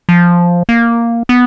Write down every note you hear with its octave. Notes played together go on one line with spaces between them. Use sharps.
F3
A#3
B3